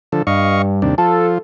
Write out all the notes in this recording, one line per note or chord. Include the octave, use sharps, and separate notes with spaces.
D3 F3 A4
G2 D#5 F5 C#6
D#2 C3 D4
F3 F4 A4